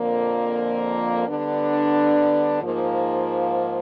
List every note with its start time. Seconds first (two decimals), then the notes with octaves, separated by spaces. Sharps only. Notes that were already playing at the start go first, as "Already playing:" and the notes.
Already playing: F2 D3 F3 A#3
1.27 D3 G3 B3 D4
2.62 G#2 F3 A#3